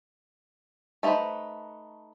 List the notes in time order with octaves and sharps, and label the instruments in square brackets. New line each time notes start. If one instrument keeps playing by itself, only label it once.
[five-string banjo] A3 D#4 G#4 B4 C5